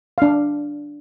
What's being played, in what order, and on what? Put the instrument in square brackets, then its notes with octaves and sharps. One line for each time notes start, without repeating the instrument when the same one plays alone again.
[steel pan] D4 F5